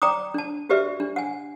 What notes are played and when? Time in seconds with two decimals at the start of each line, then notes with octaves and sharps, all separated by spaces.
0.02 D5 G5 A#5 D6 D#6
0.34 D4 A5
0.69 F#4 G4 B4 D5 E5
1.00 D4
1.16 F#5 G#5